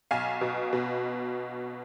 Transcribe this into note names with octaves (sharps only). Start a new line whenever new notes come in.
B1 F5 G#5
B2
B2